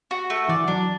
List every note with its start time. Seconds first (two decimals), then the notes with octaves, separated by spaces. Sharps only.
0.11 F#4
0.30 A3
0.49 E3 D5
0.68 F#3 D4